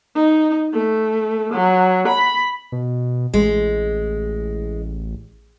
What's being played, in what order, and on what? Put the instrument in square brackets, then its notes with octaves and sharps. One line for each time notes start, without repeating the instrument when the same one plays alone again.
[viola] D#4
A3
F#3
B5
[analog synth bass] B2
[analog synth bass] A1 [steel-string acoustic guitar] G#3